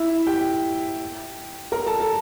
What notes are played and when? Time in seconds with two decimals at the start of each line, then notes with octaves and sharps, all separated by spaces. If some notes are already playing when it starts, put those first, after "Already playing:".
Already playing: E4 E5
0.27 G4 G5
1.72 A#4 A#5
1.87 A4 A5
2.00 A4 A5